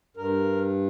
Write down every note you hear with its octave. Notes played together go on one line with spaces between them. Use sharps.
G2 A#4